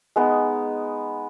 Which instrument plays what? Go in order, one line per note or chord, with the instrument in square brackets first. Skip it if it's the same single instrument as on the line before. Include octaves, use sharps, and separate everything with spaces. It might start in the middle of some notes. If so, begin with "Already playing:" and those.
[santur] G#3 B3 D#4